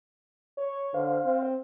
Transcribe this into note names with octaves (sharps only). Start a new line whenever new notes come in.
C#5
D3 C5 F5
C4